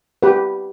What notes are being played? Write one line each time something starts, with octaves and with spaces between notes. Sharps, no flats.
G4 B4